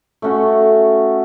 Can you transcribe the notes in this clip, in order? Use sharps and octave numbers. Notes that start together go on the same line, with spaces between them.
A3 C#4 F#4